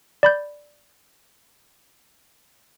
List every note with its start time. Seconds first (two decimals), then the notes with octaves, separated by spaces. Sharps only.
0.23 D5 B5 G6